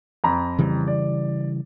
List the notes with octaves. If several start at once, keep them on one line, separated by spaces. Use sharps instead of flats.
F2 A#5 B5
C#3 E3 G3
D5